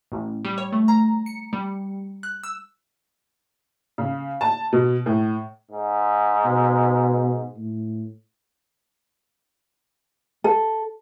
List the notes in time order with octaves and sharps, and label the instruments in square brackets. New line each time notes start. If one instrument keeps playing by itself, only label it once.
[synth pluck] A1
G3
C#5
A3
A#5
C#7
G3
F#6
E6
[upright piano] C#3
A5
B2
A2
[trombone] G#2
[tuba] B2
A2
[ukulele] A4